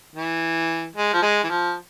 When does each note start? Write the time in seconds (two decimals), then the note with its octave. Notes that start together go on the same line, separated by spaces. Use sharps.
0.16 E3
0.96 G#3
1.13 F3
1.22 G#3
1.43 E3
1.49 F3